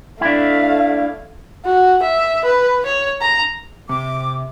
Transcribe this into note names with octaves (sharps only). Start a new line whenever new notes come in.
A3 D4 E4 F5
F#4
E5
B4
C#5
A#5
C3 D6